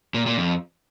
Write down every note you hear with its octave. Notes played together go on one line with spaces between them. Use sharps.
A#2
A#2
F2